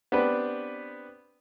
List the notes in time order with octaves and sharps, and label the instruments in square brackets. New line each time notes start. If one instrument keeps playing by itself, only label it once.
[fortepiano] B3 C4 D4 G4 B4